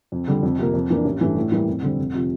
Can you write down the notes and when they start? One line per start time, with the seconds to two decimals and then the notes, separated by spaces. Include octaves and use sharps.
0.12 F2
0.28 D3 G3
0.43 F2
0.58 C3 F3 A#3
0.74 F2
0.90 E3 A#3 D4
1.05 A1
1.21 G2 E3 A3 D4
1.36 A2
1.52 E3 G3 A#3 E4
1.67 F2
1.83 D3 G3 C4
1.98 F1
2.14 C3 F3